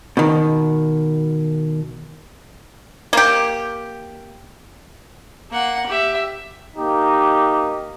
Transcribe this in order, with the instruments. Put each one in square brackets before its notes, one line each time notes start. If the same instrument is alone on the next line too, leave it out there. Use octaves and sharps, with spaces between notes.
[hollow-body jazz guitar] B2 D#3
[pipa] A#3 G4
[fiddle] A#3 F#5
G4 E5
[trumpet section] A#3 D#4 G4